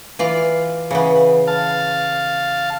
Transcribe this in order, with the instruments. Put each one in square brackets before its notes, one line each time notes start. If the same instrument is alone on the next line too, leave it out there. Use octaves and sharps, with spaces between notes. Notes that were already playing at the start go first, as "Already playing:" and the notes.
[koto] E3 F4 D5
C#3 E3 B3
[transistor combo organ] F5 A5